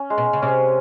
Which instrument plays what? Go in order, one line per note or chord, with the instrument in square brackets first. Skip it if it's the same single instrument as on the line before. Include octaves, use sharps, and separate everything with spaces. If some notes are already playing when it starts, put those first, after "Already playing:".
Already playing: [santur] C#4
G#3
[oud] B2
C#3
[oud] C3 [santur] C#4